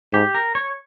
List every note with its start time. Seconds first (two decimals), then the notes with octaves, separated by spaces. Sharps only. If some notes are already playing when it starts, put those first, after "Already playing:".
0.13 G#2 G4
0.35 A#4
0.55 C#5